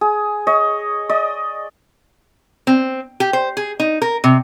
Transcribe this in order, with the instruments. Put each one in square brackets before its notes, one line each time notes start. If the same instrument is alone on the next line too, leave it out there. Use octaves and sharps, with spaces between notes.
[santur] G#4
C#5 D#5
D5 D#5
[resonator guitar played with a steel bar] C4
G4
C5
G#4
D#4
A#4
C3